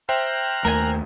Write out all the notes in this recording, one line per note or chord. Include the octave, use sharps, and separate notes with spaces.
C5 E5 G5 A#5 F6 F#6
D#2 A3 A#4 G#5